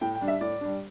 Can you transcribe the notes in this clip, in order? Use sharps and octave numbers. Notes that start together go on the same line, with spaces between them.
A2 G5
G5
G3 D4
E5
A2 D5
G3 D4